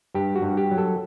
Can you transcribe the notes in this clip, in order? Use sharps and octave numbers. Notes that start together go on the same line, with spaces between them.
G2 G4
F#4
G2
G4
F#3
A4